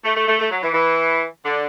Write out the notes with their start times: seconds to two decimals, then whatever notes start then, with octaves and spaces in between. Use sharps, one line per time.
0.05 A3
0.16 A3
0.28 A3
0.39 A3
0.51 F#3
0.63 E3
0.74 E3
1.45 D3